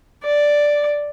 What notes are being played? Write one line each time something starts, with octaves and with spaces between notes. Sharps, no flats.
D5